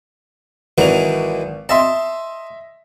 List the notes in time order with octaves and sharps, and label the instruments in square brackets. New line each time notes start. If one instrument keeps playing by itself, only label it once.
[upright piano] G#1 F7 [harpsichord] D#3 E3 F#3
[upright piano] D#5 E5 C6 [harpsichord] A5